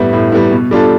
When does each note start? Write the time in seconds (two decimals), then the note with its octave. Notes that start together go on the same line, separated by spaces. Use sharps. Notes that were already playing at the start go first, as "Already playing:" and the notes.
Already playing: A2 G3 B3 E4
0.13 A2
0.32 G3 B3 E4
0.52 B2
0.71 G3 D4 F4 A4